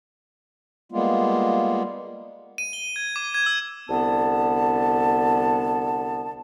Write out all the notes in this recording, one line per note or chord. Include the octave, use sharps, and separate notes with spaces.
G3 G#3 A#3 B3 F4
D#7
G7
G#6
D6
G#6
E6
C2 D3 B3 A5